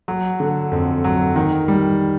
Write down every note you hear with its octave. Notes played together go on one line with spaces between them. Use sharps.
F#3
D3
F2
F#3
D#3
G3